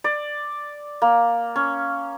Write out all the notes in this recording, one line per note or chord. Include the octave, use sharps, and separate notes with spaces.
D5
A#3
C#4